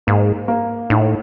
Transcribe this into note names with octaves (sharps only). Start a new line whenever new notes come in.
G#2 A#3
A#3
A2 D#4